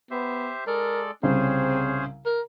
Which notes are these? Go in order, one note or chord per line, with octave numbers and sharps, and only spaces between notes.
B3 G4 C5 E5
G#3 A4 A#4 D5
C2 C#3 C4 C#4 G#4 C5
A#4